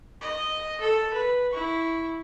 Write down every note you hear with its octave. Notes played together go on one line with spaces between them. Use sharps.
D#5
A4
B4
E4 C#6